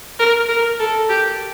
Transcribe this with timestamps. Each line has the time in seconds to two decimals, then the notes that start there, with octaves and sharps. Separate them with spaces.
0.19 A#4
0.49 A#4
0.79 A4
1.09 G4